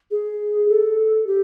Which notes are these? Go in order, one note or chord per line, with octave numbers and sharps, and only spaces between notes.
G#4
A4
G4